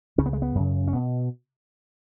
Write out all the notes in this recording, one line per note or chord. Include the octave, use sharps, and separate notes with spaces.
C#2 C#3 C#4
B3
G#3
B3
F#2 C#3
C#4
B2 B3